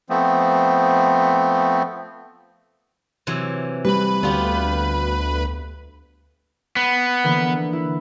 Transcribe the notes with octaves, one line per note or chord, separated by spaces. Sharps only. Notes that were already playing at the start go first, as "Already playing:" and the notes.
F3 A3 B3 C4
C3 E3 F#3
G3 B4 B5
D2 B3 F4 G4
B3
D3 E3 A#3
E4